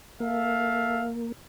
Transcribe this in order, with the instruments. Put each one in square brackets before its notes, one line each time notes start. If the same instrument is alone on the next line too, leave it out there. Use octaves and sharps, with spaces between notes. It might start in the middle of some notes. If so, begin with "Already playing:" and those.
[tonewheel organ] A#3 [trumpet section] A4 E5 F5